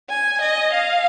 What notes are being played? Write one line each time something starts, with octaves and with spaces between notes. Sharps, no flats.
G#5
D#5
F5